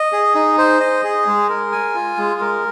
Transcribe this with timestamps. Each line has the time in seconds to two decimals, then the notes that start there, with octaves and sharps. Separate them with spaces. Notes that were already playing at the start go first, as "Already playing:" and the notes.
Already playing: D#5
0.12 G#4
0.35 D#4
0.58 C5
0.80 D#5
1.04 G#4
1.27 G#3
1.49 A#4
1.72 G#5
1.95 F4
2.18 G#3
2.41 A#4